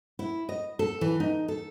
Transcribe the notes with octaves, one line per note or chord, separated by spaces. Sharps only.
E4
D#5
A4
E3
D#4
A4